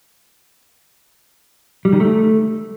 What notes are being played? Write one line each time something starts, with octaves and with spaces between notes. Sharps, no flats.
G3
D#3
A3